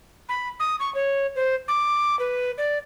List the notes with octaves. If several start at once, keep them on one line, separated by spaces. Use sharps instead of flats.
B5
D#6
C#6
C#5
C5
D6
B4
D5